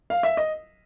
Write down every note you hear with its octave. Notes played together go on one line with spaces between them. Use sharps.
F5
E5
D#5